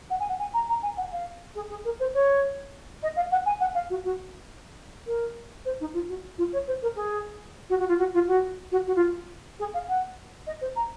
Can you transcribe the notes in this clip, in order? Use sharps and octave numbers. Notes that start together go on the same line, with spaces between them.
F#5
G#5
F#5
G#5
A#5
A#5
G#5
F#5
F5
G#4
G#4
A#4
C5
C#5
D#5
F5
F#5
G#5
F#5
F5
F#4
F#4
A#4
C5
D#4
F4
F#4
F4
C#5
C5
A#4
G#4
F#4
F#4
F4
F#4
F4
F#4
F#4
F#4
F4
G#4
F5
F#5
D#5
C5
A#5